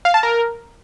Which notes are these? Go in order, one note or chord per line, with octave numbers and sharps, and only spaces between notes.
F5
A5
A#4